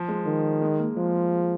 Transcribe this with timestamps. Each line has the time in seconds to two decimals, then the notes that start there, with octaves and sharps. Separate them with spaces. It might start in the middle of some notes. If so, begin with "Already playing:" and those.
Already playing: F3
0.09 G#3
0.26 D#3
0.62 G#3
0.80 A#3
0.97 F3 G#3